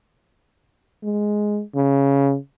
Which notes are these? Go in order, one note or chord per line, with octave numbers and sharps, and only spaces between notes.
G#3
C#3